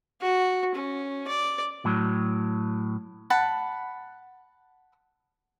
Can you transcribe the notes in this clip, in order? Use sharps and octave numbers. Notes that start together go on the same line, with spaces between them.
F#4
C#4
D5
A2 F#3
F#5 A5 B5